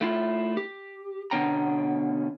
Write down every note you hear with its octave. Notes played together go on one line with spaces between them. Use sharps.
A3 E4 F4
G4
B2 D3 B3 C#4 G5 A#5